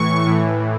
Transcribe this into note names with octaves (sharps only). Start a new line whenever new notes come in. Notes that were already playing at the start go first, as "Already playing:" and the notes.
Already playing: A2 E3 C#6
A2 E3